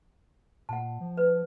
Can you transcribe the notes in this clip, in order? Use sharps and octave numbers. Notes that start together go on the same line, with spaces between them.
A#2 F#5 A5
F3
B4